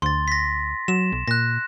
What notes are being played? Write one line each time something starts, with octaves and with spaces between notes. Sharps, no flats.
D2 C6 A6
A#6 B6
F#3 E7
B1
A#2 F#6 A#6